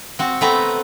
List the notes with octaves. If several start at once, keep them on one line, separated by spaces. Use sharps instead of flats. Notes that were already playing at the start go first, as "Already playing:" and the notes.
C4 F#4
A3 B3 C4 B4 A#5